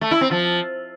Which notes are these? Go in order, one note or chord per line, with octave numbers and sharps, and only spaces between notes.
A3
E4
C4
F3